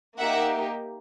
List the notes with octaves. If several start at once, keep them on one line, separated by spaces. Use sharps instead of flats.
A#3 D#4 G4 E5 F#5